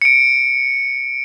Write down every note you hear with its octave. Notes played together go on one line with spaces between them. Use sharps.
C#7 D7